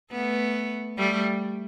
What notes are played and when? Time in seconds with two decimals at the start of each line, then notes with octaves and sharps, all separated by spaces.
0.11 A3 B3
0.98 G3 A3